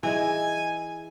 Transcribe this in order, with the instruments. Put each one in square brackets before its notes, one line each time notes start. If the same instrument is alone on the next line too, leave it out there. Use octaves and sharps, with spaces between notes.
[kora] E3 [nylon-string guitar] G#4 D#5 E5 [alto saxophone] G#5